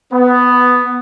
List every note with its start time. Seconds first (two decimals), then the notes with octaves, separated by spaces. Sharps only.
0.13 B3